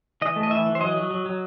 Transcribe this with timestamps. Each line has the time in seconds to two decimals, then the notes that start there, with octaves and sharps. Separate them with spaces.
0.22 E3 D#5
0.36 A3
0.43 D#5
0.51 E3 E5
0.66 E3
0.75 C5
0.81 F#3 D#5
0.97 F#3
1.11 F#3
1.26 F#3